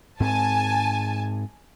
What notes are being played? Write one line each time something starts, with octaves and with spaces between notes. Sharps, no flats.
G#2 C4 G#5 A5